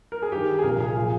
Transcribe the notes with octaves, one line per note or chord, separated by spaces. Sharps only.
A#4
G#4
G2 D#3 G4
G#4
C2 A#2 F3 A#4
G#4
A#2 F3 G#4